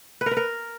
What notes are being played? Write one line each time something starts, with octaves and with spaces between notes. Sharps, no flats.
B4
A#4
B4
A#4